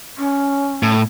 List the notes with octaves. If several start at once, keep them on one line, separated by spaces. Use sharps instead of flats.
C#4
A2